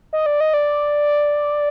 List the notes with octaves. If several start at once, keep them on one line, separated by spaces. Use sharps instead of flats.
D#5
D5
D#5
D5